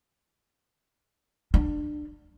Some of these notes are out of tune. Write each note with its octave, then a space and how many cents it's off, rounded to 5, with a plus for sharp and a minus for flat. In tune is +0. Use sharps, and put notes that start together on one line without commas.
D4 +25